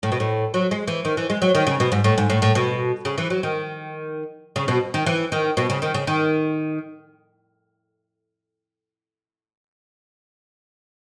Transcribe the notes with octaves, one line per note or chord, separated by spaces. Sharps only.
A2
B2
A2
F#3
G#3
E3
D#3
E3
G#3
F#3
D#3
C#3
B2
G#2
A2
G#2
A2
A2
B2
C#3
E3
F#3
D#3
C#3
B2
D#3
E3
D#3
B2
C#3
D#3
C#3
D#3